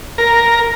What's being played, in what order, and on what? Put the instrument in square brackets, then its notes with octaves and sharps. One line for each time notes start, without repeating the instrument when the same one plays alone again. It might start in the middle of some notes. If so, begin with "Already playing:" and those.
[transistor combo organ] A#4